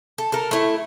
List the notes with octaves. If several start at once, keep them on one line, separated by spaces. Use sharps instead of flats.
A4
A4 A#4
A3 E4